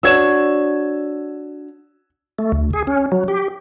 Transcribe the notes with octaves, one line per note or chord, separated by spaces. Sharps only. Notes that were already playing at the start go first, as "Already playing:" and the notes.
D4 F#4 C#5 E6 G#6 E7
A3
D2
G#4
C#4
F#3
G4